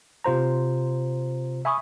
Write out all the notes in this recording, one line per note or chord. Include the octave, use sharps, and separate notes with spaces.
C3 F4 C5 A#5
E5 G#5 B5 C#6 D#6